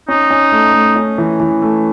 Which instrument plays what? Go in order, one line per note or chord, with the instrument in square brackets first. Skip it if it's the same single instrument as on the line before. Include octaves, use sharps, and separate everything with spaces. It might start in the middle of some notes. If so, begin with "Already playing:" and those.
[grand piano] C#4 [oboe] D#4
[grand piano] C#4
A3
A3
C#4
E3
E3
A3